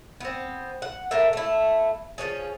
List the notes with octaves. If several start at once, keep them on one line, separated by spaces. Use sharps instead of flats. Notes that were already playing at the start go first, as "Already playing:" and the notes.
B3 C4
F#5
A2 A#4 E5
A3 E4
F3 G#3 C#4 G#4